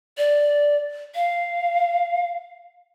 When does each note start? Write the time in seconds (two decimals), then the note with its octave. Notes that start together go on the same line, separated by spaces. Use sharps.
0.18 D5
1.15 F5